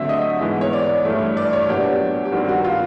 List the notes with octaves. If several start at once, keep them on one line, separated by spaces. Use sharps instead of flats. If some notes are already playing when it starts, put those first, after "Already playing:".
Already playing: D3 F#3 A3 C4 E5
D#5
G#2 E3 G#3 B3
C#5
D5
G2 E3 A3
D5
C#5
A#2 F#3 B3 D4 G4
G4
G2 D#3 G3 C4 F#4
F#4
F4